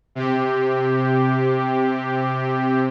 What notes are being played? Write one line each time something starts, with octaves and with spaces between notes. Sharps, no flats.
C3 G4